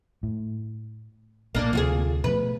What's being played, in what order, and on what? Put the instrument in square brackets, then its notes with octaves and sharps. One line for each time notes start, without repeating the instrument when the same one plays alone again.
[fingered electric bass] A2
[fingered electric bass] B1 A#2 [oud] A#3 D4
[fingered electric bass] D2 C3 F3 [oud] F4 F#4 G#4
[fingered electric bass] B2 F3 A3 [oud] B4